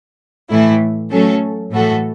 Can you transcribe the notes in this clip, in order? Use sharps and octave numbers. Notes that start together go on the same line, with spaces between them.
A2 E3 A3 E4
F#3 A3 C#4 A4
A2 E3 A3 F#4 A4